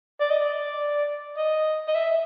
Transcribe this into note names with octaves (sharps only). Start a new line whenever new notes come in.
D5
D#5
D5
D#5
D#5
E5